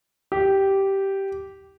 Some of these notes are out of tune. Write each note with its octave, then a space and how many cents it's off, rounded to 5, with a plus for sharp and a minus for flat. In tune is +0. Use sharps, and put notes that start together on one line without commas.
G4 -10